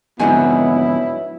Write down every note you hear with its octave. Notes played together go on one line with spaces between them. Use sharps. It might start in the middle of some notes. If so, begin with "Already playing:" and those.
F2 G#2 D3 F#3 B3 D#4 E4 G#4